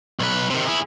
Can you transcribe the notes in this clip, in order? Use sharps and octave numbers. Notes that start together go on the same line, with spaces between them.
B1 B4
C3 D#3
E4 G#4